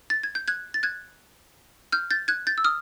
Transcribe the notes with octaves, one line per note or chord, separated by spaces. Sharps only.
A6
G#6
G6
F#6 G#6
A6
F#6 G#6
F6 G6
G6 A6
F#6 G#6
G6 A6
E6
D#6 F6